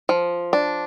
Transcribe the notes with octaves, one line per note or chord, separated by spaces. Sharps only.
F3
D4